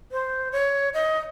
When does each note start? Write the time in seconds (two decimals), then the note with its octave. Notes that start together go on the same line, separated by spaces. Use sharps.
0.12 C5
0.52 C#5
0.94 D#5